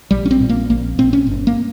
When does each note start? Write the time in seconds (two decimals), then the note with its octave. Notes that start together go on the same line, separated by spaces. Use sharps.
0.11 A#1 G3
0.25 C#4
0.31 C4
0.40 A#2
0.49 A#3
0.70 A#1 A#3
0.98 A#2 C4
1.13 C#4
1.27 G1
1.47 A#3